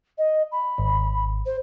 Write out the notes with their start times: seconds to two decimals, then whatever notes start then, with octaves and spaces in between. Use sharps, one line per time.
0.18 D#5
0.52 B5
0.78 G#1
1.46 C5